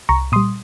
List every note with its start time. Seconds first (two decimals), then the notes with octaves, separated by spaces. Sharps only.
0.09 C2 A#5 C#6
0.32 A#2 C6 D#6
0.36 G3